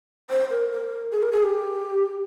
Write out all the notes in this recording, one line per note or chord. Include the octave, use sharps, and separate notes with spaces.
C5
A#4
A#4
G#4
A#4
G#4
G4